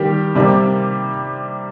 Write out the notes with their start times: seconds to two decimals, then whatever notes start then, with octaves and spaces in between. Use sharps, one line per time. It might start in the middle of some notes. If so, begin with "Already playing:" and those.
Already playing: D#3 G3 A#3 G4
0.35 C3 G3 A#3